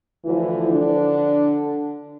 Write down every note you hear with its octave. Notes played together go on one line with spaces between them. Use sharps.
D2 D3 E3 F3 E4
D3 D4